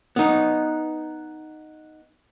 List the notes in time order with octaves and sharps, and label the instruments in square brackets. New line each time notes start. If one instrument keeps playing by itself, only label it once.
[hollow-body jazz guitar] B3 D#4